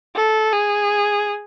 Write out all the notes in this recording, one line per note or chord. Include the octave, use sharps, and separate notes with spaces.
A4
G#4